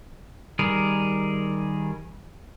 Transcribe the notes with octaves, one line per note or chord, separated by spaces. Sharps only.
D#3 G3 G#4 A#4